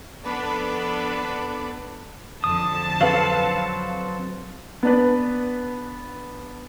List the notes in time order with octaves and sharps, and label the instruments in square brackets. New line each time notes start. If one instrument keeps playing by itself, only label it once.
[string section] F2 B3 D4 A4 B4 D5
[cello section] F2 D3 [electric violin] A5 [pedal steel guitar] D#6
[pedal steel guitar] F#3 C4 A4 [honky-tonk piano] B4 F5
[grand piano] B3 D4 B4